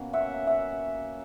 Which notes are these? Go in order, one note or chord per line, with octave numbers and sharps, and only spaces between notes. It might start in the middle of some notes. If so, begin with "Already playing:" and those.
Already playing: B2 F#3 A#3 C#4
E5 F#5
E5 F#5